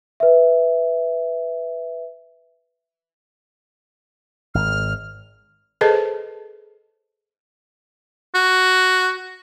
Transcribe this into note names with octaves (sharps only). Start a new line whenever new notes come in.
B4 E5
G#1 F6
G#4 A4 B4 C5 D#5 A5
F#4